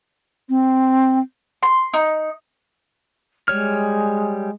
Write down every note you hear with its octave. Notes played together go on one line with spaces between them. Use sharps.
C4
C6
D#4
G3 G#3 C#5 F6